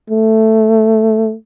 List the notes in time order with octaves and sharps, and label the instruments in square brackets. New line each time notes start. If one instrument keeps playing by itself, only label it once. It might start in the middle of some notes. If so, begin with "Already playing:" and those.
[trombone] A3